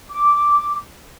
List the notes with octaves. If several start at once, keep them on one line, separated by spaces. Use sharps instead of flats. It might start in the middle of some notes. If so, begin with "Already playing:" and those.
D6